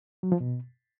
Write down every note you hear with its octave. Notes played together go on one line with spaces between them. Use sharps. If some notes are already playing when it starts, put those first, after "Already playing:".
F#3
F3
B2